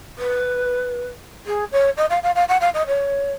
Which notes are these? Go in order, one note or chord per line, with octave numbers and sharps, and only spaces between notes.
B4
G#4
C#5
D#5
F5
F5
F5
F#5
F5
D#5
C#5